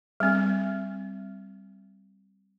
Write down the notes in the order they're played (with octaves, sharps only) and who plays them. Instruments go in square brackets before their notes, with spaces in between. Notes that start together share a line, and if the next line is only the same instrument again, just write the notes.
[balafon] G3 C4